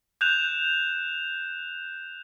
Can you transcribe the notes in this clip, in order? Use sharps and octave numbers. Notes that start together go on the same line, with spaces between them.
F#6 G6 E7 F7